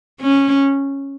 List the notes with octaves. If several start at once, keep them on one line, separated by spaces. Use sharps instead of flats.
C#4